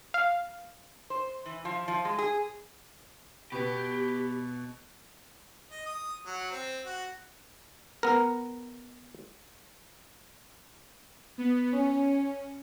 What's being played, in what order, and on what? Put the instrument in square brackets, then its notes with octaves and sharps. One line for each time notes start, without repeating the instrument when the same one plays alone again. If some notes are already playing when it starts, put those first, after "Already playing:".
[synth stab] F5
[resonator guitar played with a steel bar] C5
E3
F3
F3
G#3
G#4
[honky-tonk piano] B2 B3 [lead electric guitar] G4 [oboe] B5
[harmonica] D#5
D#6
F#3
C4
F#4
[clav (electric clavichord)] B3 A#4
[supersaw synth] B3
C#4